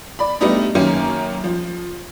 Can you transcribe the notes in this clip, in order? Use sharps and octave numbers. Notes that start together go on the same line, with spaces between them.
D5 B5
G3 A3 B3 D4 D#4
F#2 D#3 A#3 C#4
F3